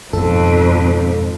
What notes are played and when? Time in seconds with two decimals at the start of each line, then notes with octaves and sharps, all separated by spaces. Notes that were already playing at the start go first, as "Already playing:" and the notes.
0.13 F2 G#2 B2 D#3 A4